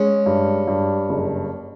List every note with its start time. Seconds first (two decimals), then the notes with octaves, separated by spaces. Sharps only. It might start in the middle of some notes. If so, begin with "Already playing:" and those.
Already playing: G#3 C#4
0.26 G2
0.68 G2
1.09 F#1